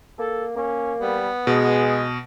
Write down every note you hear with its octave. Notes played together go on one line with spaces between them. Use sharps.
A#3 A4
A#3 C#4
G3 B3
B2 G#3 G#4